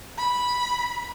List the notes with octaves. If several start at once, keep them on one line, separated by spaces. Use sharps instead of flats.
B5